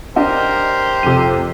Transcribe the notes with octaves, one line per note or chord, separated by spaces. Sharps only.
D4 G4 A#4 C5 D#5
F2 C3 D#7